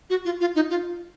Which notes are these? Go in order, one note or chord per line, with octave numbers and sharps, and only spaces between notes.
F#4
F4
F4
D#4
F4